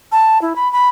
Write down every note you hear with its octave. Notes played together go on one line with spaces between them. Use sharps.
A5
E4
B5
B5